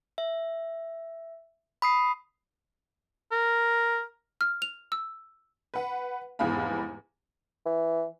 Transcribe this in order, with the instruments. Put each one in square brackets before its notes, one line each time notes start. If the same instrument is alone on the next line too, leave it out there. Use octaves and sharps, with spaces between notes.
[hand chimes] E5
B5 D#6 C7
[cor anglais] A#4
[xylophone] F6
F7
E6
[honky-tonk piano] B4 F#5
F1 E2 G#2 F5 B5
[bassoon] E3